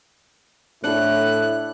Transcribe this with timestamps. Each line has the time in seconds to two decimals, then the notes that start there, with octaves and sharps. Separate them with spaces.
0.84 A2 D4 E4 A4 F#6